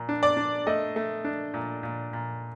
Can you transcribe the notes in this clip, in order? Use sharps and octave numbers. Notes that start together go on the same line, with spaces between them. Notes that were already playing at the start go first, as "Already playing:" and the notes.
Already playing: A#2
D4
D5
D4
A3 D#5
A3
D4
A#2
A#2
A#2